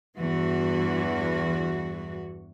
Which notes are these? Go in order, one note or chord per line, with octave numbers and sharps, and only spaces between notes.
E2 G2 E3 F#4